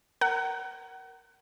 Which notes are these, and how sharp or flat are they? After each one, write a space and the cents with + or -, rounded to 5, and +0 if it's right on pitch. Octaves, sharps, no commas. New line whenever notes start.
A#4 +0 F#5 +40